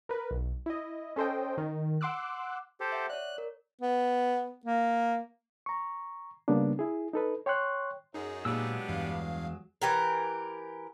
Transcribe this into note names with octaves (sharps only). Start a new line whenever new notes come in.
A#4 B4
B1
E4 D#5
C#4 A4 C5 D#5 G5
D#3
F#5 C6 D6 E6 F#6
G4 A4 C5
E5 F#5
C#5 D5 F#6
A#4
B3
A#3
A#5 C#6
C#3 G3 A#3 B3 D4
E4 G#4
D#4 A4 B4
C#5 G5 C6 C#6 F#6
F#2 D#4 G#4
A#2 F#3 G#3 B3 D4 G4 E6
E2 G2 F5
E3 G4 A#4